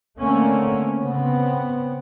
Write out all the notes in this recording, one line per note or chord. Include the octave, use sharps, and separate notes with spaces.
D3 A3 A#3 C4 C#4
C#3 B3 C4